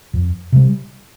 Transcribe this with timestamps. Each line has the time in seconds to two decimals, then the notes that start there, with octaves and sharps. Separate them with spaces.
0.13 F2
0.52 C3 G3